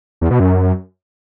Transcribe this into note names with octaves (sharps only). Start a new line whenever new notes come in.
E2
B2
F#2